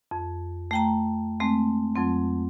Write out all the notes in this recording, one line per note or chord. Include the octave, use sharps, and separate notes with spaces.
F2
A3 G5 A#5
G#3 A3 C4
F2 F#3 C4